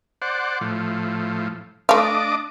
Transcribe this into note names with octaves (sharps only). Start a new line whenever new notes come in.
C5 D5 F#5
A2 F3
A3 D4 D#5 F5 D6